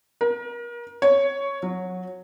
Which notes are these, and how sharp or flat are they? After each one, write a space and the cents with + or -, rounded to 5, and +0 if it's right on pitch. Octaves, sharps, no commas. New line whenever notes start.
A#4 +35
C#5 +5
F#3 -20